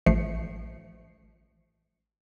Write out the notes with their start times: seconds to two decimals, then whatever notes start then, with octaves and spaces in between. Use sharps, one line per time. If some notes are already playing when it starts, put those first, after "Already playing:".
0.06 A1 F3 A3 C7 C#7